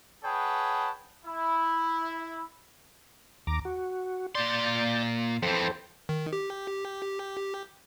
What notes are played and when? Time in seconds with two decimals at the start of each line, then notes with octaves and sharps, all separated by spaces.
0.24 G#4 B4 C#5 F#5 G5 A5
1.25 E4
3.47 D#2 A#5 D6
3.65 F#4
4.35 A#2 D5 C6 G6 A6
5.43 F2 E3 A4 C5 G5
6.09 D#3
6.33 G4